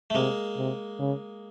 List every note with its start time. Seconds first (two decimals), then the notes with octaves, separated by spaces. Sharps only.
0.10 A3
0.14 C3 G#3 A#3
0.58 C3
0.99 C#3